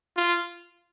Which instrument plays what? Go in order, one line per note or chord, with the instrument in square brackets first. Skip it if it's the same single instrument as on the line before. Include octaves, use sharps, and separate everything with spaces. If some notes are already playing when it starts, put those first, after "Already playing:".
[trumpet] F4